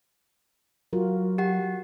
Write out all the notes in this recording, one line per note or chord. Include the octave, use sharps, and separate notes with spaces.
F#3 F4 F#4 A#4
G4 F#5